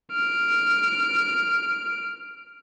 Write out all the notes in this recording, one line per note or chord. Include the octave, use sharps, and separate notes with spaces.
F6 D7